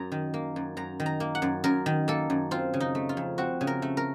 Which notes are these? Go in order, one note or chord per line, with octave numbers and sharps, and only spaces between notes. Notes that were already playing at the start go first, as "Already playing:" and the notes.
Already playing: F#2 A#5
D#3
A#3
F#2
F#2 A#5
D#3
A#5
A#3
F#5
F#2
F#2 A#4
D#3
A#3 A4
F#2
C4 F4
C#3
D#4
A3
F4
F2
C4 F#4
C#3
A#4
A3
A#4